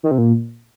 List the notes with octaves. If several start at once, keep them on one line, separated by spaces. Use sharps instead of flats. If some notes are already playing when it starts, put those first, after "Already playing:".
D#3
C3
A#2